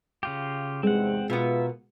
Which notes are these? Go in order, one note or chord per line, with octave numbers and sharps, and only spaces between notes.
C#3 F4 G4
E2 G#2 C3 G#3 C4 F#5
B2 B3 F4 A#4 B4 E5